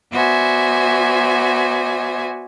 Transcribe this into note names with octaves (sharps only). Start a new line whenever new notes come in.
B3 F#4 C5 D5 E5 G#5